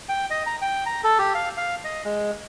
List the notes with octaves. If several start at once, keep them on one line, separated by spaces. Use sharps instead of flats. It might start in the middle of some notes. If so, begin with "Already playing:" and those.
G5
D#5
A#5
G5
A#5
A4
G4
F5
F5
D#5
G#3